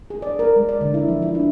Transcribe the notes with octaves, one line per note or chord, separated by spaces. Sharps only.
G#4
D5
A#4
G#3
D5
D3
E4
F3
E4
D4